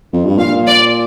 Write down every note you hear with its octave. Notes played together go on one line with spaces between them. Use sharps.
F2
G2
A#2 F5
D5